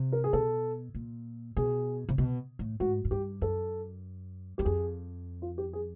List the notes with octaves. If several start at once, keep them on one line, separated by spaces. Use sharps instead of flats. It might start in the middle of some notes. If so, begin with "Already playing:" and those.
Already playing: C3
A#4
G#4
B2 A4
A#2
B2 G#4
C3
B2
A2
G#2 F#4
G#2
G2 G4
F#2 A4
F#2 G4
F2 G#4
F4
G4
G#4